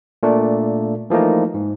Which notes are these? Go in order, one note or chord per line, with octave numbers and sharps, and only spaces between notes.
A#2 A3 D4
E3 F3 A3 A#3 D#4
G#2